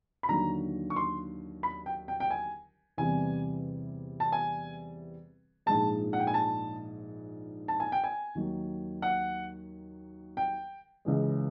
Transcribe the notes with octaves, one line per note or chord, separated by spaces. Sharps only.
B5
D#2 D3 F#3 A#5
C#6
C6
B5
G5
G5
G5
G#5
E2 C3 E3 G3 G#5
A5
G#5
A#1 G#2 F3 G#3 A5
F#5
G5
G#5
A5
A5
G#5
G5
G#5
D#2 D#3 F#3
F#5
G5
C#2 C#3 E3 G#3